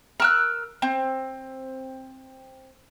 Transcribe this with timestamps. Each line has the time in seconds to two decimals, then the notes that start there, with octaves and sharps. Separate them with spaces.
0.20 A#4 E6 F#6
0.82 C4